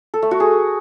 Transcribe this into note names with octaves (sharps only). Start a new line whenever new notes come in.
A4
A3
F#4
G#4